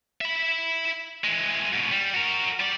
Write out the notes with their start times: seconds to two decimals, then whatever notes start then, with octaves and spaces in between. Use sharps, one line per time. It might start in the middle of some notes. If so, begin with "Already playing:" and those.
0.21 E5 B5
1.24 E3 G#3
1.73 G#2 B2
1.91 G3
2.14 F#4 A#4
2.60 G3 D5